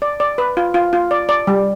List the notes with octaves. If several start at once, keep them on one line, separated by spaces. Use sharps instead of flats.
D5
D5
B4
F4
F4
F4
D5
D5
G3